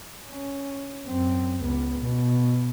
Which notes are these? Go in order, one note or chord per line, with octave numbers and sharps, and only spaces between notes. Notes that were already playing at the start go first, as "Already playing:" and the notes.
C#4
F#2 C4
C#2 B3
B2